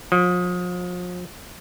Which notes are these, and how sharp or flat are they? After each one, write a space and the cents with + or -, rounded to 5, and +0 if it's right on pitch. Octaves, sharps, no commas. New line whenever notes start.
F3 +40